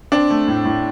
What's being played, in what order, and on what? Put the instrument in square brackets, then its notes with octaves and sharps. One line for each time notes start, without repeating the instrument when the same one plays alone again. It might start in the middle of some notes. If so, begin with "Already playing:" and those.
[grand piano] C4 [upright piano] D4
[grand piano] A3
A2
A2